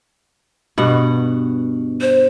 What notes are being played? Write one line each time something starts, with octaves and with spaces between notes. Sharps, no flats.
G2 B2 F#5
C5